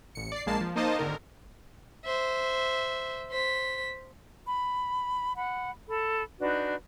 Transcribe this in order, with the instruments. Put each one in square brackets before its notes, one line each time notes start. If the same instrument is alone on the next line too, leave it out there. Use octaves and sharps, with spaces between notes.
[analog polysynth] A1 C#7
D5 C7
A#1 G#3 A#3 A5 C7
F3
A#3 D#4 C5 D#5 A5
G#1 D3 D#3 A#4
[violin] C5 E5
C5 B6
[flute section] B5
F#5 B5
A4 B5
D4 D#4 F#4 B4